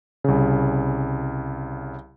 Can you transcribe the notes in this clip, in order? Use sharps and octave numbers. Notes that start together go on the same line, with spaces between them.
C2 C#3